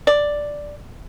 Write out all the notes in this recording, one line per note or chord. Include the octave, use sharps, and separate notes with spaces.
D5